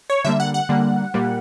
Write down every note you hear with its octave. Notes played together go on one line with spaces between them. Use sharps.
C#5
D3 G3 A#3 E5
F#5
F#5
D3 G3 A#3
A#2 G3 A#3